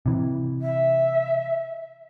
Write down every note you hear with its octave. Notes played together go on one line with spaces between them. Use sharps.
C3 E3
E5